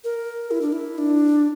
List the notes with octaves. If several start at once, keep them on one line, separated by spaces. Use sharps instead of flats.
A#4
E4
D4
E4
D4